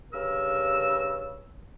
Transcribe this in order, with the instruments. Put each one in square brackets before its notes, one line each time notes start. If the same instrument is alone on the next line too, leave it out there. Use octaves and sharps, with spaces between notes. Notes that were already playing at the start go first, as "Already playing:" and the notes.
[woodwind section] G2 C#3 A#4 E6